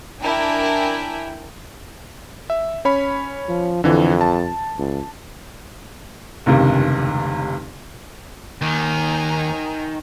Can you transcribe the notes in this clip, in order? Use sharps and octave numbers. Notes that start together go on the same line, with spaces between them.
D4 E4 A#4 G5 G#5
E5
C#4 C#5 B5
F3
F2 D3 E3
A5
C#2
F1 C#2 G2 C3 D#3
D#2 D#3 G#5 A#5